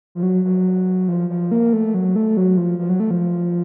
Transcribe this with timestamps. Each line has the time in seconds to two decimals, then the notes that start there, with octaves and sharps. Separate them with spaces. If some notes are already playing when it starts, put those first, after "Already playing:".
0.15 F3
0.23 F#3
0.45 F#3
1.08 F3
1.30 F3
1.51 A#3
1.73 A3
1.94 F#3
2.16 A3
2.37 F#3
2.57 F3
2.79 F3
2.89 F#3
3.00 A3
3.11 F3